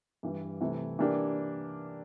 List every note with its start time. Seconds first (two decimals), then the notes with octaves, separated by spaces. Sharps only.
0.23 G2 E3 G3
0.60 C3 E3 A3
0.99 E3 A#3 D4 G4